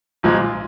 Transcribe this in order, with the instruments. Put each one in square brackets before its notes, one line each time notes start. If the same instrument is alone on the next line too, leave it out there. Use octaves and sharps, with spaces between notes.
[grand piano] B1 A#2 F3 G#3